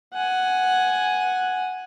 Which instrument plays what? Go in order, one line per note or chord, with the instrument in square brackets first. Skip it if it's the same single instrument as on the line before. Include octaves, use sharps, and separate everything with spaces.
[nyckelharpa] F#5 G#5